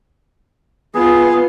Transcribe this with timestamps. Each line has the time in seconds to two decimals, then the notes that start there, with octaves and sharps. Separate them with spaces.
0.95 B3 F4 G#4